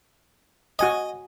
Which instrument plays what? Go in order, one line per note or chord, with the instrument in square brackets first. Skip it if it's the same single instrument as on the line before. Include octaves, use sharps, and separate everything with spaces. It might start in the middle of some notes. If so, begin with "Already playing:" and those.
[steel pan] F#4 G#5 D#6 [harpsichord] D#5